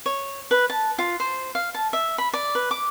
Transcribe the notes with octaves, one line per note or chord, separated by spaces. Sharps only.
C#5
B4
A5
F4
C5
F5
A5
E5
B5
D5
B4
D6